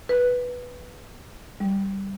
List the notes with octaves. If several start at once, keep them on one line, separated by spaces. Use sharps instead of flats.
B4
G3